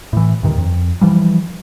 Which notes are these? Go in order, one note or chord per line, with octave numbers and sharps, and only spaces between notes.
A2 E3
D2 G2 D#3
F2
E3 F3 G3